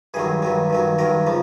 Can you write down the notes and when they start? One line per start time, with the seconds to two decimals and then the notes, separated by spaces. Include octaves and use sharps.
0.14 G2 D#3 F#3 G#4
0.42 G2 D#3 F#3
0.70 G2 D#3 F#3
0.99 G2 D#3 F#3 A#4
1.27 C#3 F3